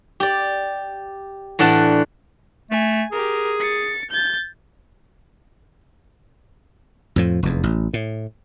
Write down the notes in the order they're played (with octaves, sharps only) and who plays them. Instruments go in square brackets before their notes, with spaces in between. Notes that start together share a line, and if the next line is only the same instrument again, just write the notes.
[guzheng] G4 D5
A2 E3 D4 F#5 A5
[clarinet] A3 [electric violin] G#5
[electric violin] G4 A#4 [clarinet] G#4
[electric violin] A6 C#7
G6 A6
[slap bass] F2 A2 F3
F1 E2
A1
A2